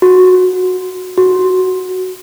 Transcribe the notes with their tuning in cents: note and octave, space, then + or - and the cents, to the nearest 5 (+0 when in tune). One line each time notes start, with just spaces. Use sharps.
F#4 -10
F#4 +5